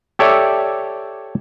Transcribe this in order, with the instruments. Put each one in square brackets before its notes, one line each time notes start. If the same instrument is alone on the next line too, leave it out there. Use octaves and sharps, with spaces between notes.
[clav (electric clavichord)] G4 A4 C#5 D5 E5